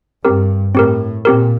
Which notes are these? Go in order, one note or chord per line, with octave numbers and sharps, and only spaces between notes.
G2 C4 G4 A#4
A2 C4 G4 A#4
A#2 C4 G4 A#4